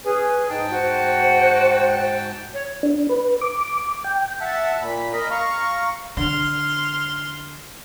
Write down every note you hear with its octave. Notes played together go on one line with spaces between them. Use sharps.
C#4 G#4 B4
G#2 D#4 G5 A5
F#4 C5
C#5
D4
B4
D6
G5
E5 F#5 A5
A#2 B5
A#4 D#5 B5
F5 A#5 C#6
D3 C6 F6